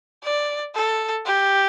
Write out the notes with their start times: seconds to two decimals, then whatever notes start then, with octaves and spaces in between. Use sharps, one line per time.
0.23 D5
0.75 A4
1.26 G4